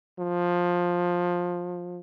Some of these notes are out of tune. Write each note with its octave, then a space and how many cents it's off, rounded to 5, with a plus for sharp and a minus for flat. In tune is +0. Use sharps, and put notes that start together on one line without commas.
F3 +15